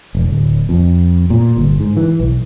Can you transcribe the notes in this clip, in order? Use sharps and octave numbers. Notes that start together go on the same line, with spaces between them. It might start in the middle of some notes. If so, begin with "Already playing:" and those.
E1
D1
F2
A#2
G1
G#2
E3
B1